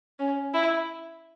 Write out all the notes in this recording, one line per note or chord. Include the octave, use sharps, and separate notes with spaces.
C#4
E4